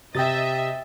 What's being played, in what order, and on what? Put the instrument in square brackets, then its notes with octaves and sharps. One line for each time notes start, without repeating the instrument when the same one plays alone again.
[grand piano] C3 [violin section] D#5 E5 [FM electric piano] G5 D#6 A6